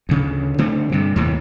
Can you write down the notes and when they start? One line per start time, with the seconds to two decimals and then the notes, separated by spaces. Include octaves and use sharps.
0.09 D2 C#3
0.58 D3 A3 C4
0.92 G2 C3
1.16 D#2 A2 C3